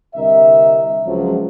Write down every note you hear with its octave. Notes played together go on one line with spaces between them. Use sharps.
C2 D3 A#4 D#5 E5
C#2 F3 F#3